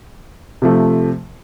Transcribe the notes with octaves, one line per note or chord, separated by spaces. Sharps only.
C3 F3 A3